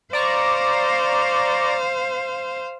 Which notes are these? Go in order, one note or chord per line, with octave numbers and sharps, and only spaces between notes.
C5 D5 F5 A#5 C#6